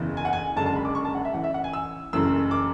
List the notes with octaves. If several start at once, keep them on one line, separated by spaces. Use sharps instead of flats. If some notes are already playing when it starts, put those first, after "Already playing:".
Already playing: F#1 E2 C#3 E3
G#5
F#5
G#5
F#1 F#2 D3 G#3 A5
A5
B5
D6
C#6
A5
F#5
E5
A1 A2 E3 F#5
E5
F#5
G#5
E6
F#1 F#2 E3 A3 E6
D6